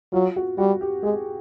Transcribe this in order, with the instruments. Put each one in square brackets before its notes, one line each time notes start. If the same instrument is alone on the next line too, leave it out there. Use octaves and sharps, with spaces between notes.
[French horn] F#3 [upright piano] F4
[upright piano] F#4
[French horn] G3 [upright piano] F#4
[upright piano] G4
[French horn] G#3 [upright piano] G#4